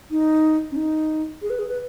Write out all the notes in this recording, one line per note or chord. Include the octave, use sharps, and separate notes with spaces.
D#4
C#4
D#4
G#4
B4
G#4
B4